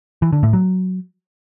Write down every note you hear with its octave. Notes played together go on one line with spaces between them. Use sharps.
E3
D3
A2
F#3